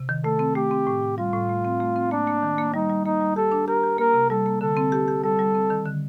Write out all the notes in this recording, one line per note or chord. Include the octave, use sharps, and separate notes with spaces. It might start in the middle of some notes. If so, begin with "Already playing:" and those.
Already playing: C3
D#3
A3 A4
C4
A3 G4
C4
A2
A2
G3 F4
A2
A3
C4
A3
C4
A#3 D4
A#3
D#3
A#3
G3 D#4
G3
A#3 D#4
G3
G4 A4
D4
G4 A#4
G4
A#3 A#4
C3
G3 A4
A#3
D3 A4
C4
G4
G4
G3 A4
G3
C4
D#3
D3